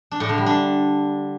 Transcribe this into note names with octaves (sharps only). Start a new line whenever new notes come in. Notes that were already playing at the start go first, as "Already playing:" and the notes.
D4
A2
D3
G3
D4